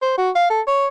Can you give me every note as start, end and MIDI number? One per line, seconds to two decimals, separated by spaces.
0.02 0.14 72
0.18 0.30 66
0.35 0.49 77
0.50 0.61 69
0.67 0.87 73